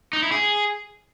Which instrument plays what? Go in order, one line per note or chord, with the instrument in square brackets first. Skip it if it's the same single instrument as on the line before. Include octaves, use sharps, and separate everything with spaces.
[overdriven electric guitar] D#4
E4
G#4